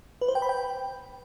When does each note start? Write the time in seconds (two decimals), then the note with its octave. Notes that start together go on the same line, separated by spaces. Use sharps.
0.21 B4
0.28 C5
0.35 G5
0.42 B5
0.49 G5